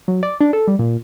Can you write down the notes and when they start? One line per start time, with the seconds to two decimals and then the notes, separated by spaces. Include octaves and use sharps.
0.08 F#3
0.23 D5
0.41 D4
0.53 A4
0.67 G3
0.79 A#2